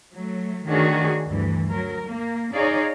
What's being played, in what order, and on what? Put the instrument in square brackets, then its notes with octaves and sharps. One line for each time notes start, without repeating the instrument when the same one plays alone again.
[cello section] F#3 A3
D#3 A3 D4 F#4 G#4 C#5
D2 G2 E3
F#3 A#4
A#3
D#4 G#4 C#5 D5 F5